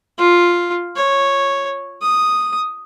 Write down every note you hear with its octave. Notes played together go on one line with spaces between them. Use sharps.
F4
C#5
D#6